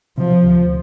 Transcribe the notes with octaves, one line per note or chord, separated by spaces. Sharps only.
C3 F3
D2